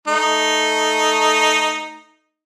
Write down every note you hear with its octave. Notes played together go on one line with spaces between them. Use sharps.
A3 D#4